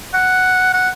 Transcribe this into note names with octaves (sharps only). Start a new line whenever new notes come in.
F#5
F#5